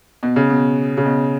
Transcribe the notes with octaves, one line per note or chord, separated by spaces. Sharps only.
B2
C#3
B2
C#3
B2